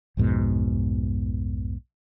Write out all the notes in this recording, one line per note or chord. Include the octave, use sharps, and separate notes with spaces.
B1 F2 G#2 B2